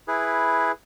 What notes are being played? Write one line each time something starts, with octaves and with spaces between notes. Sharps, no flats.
E4 G#4 B4